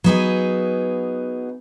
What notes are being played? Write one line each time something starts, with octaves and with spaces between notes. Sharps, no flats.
F#3 B3 D#4 G#4